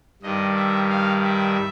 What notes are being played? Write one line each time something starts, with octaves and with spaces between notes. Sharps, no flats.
G2 D#3 G3 D#5
E5
F5
E5